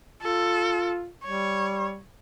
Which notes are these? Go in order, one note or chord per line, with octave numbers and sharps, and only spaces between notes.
F4 A4
G3 C#5